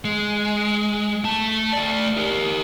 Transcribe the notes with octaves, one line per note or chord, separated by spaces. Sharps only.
G#3
A3 A5
A3 D5
G4 A#4